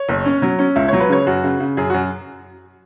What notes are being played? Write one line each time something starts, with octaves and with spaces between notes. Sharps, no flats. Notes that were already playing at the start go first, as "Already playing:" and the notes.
Already playing: C#5
F#1
C#4
F#3
C#4
C#2 E5
F#3 C#5
B4
C#3 C#5
F#2 F#4
C#3
C#3
F#2 G#4
F#4
F#2